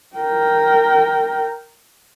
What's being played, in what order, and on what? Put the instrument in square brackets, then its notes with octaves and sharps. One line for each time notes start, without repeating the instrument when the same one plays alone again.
[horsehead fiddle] A#4 G5